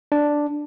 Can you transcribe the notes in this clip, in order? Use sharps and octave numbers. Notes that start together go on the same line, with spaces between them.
D4